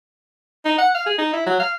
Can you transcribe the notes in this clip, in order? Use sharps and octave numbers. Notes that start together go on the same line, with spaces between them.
D#4
F#5
F5
G#4
D#4
E4
F#3
F5